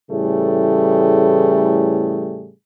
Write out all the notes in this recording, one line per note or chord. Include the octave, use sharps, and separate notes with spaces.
A2 C#3 E3 G3 A3 G#4